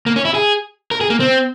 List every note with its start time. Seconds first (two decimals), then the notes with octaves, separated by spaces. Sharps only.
0.06 A#3
0.16 C#4
0.25 E4
0.35 G#4
0.91 A#4
1.01 G#4
1.10 A#3
1.20 C4